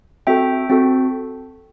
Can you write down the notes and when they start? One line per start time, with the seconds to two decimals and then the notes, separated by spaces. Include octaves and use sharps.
0.27 C4 F#4 A4 E5 G5
0.70 C4 F#4 A4